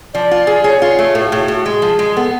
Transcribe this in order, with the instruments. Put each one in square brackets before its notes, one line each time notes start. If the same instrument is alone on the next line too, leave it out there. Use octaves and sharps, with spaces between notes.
[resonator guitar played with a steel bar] F3 [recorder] D5
[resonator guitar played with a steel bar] F4
G#4
[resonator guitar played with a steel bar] G#4 [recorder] C#5
[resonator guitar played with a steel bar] F4
A3
[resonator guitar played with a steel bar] A2 [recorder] A4
[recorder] F#4
[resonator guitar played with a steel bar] A2 [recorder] G#4
[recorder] F#4
[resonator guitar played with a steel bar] A2
[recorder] F#4
[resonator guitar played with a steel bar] G#3 [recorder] G#4
[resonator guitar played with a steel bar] F3
G#3
[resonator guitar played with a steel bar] B3 [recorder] A4